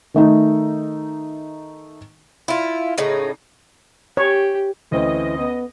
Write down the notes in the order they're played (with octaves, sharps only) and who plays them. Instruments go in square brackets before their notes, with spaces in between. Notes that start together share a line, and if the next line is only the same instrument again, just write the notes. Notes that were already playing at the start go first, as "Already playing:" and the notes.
[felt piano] D#3 A3 D#4
[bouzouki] E4 F4
A2 C#3 D#4
[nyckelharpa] G4 [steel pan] C#5
[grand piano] D2 C4 C#4 [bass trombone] E3 [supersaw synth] D#5
[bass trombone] B3